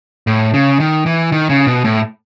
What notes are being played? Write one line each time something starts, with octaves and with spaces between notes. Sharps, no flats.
A2
C#3
D#3
E3
D#3
C#3
B2
A2